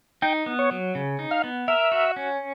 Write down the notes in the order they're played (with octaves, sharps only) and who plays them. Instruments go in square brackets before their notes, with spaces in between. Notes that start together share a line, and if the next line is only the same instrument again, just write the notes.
[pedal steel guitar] D#4 [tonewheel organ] G5
[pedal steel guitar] B3
[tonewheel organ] C#5
[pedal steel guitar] F#3
C#3
D#4
[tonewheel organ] F5
[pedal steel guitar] B3
[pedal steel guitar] A#4 [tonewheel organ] E5
[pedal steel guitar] F#4
C#4